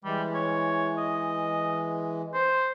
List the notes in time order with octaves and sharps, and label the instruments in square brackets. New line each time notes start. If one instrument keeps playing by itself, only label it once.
[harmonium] E3 G#3 [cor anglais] G3
[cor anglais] C#5
D#5
C5